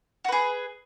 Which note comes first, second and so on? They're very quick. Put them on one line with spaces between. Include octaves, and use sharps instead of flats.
F#4 B4 G#4